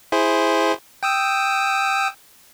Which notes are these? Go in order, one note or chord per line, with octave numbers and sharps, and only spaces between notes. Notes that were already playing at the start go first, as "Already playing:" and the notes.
E4 G#4 C5
G5 D#6 E6